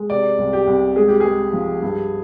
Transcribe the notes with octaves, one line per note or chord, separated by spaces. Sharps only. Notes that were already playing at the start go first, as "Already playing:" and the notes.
Already playing: G#3
C3 D5
C2
G4
C2
G#3 G#4
G4
G#4
G#3
F3
G2